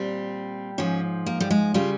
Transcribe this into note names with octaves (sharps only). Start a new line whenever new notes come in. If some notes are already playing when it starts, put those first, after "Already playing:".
Already playing: A#2 G3 C4
G#2 F3 C#4
A#3
G3
G#3
C#3 G3 F4